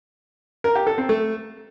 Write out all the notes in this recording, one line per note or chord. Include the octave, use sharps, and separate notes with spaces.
A#4
G4
A4
C4
A3